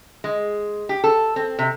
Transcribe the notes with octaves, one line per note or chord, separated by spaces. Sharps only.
G#3
G4
A4
C4
C3